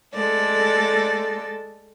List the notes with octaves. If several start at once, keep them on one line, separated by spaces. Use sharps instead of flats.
G#3 A3 A4 D5